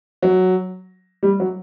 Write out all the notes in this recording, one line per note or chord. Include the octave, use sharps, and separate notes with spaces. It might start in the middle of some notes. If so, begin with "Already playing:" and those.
F#3
G3
F#3